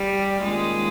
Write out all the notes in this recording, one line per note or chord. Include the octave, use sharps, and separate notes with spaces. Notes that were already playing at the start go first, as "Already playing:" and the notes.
Already playing: G3
G#2 D#3 G#3 A#3 C#4 F4